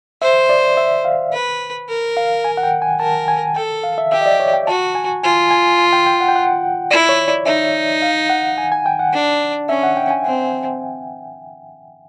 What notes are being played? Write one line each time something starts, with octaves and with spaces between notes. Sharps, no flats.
C5 E5
D5
E5
F5
B4
A#4
F5
G#5
F#5
G5
G#5
A#4 A5
G#5
A4 G5
F5
E5
G4 E5
D#5
D5
C#5
G5
F#4 A5
G#5
F4 G#5
G#5
G#5
G5
G5
F#5
G5
F#5
E4 D5
C#5
D5
D#4 E5
F5
F#5
G#5
G#5
G5
F#5
D4
C#4 E5
F#5
G5
G#5
C4